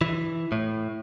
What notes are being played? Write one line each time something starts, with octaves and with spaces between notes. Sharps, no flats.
E3
A2